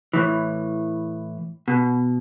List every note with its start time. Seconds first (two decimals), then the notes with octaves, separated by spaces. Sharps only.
0.13 A2 E3
1.68 B2